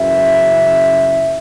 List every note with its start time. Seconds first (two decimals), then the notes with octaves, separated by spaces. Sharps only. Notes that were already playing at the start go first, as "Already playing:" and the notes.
Already playing: F#1 F#2 C#3 E3 E5